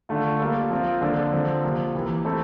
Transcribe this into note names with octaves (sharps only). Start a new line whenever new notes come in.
D3 A3 D4 F4
G3 A#3 F4 A4
F3 C4 F4
D3 F3 A#3 D4 A4
D3 F3 C4
C3 F3 A#3
C3 E3 A#3
A3 C4 E4 A4